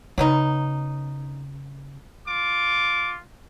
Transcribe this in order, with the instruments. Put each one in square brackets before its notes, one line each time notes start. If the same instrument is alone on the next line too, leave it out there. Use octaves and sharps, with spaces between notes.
[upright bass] C#3 [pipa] F#3 B3 D#4
[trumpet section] F4 D6